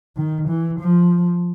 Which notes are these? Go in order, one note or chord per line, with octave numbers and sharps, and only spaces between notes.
D#3
E3
F3